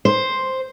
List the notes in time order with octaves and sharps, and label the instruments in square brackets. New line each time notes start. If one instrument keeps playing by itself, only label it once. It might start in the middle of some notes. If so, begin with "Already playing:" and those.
[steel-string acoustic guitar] C5